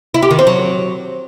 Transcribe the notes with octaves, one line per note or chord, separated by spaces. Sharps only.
E4
G4
D#3
C4
F#3